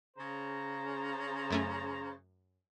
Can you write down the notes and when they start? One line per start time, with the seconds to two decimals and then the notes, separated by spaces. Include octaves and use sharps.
0.17 C#3 C5 A#5
1.51 F#2 A3 C#4